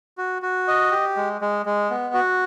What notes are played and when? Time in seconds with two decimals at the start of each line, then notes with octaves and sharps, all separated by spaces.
0.18 F#4
0.42 F#4
0.68 D#5
0.91 G4
1.17 G#3
1.41 G#3
1.66 G#3
1.90 B3
2.14 F#4